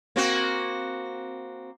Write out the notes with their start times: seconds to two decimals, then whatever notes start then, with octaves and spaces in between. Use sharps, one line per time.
0.16 A#3 C4 F#4